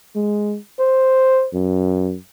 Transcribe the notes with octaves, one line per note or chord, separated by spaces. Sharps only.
G#3
C5
F#2